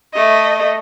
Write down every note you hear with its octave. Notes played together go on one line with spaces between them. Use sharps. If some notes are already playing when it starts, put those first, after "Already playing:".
A3 D#5